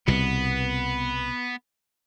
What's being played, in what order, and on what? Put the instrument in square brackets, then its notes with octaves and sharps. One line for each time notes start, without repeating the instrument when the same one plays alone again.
[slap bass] C2 B2 [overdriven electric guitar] B3